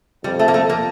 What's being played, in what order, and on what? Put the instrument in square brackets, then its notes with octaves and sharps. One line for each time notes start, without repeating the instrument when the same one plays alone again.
[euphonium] F2 [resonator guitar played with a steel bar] G3
[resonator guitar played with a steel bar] A3
A#3
A3
A#3